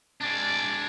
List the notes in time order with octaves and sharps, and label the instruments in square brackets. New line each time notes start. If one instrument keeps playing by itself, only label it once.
[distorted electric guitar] G#3 D4 [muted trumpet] D5